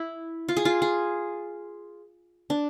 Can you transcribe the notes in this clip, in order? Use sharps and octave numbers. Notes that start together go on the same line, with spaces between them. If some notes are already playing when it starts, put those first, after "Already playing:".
Already playing: E4
F4
G#4
F4
G#4
D4